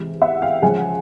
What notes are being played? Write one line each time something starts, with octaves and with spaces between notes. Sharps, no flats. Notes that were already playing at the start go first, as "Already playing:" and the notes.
Already playing: C3 E3 G#3
E5 F#5
F5 G5
C#3 F3 G#3 F#5 G#5